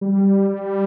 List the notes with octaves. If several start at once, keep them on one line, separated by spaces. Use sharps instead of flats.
G3
G3